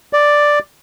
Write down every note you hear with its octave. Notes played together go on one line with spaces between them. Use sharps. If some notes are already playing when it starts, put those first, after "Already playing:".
D5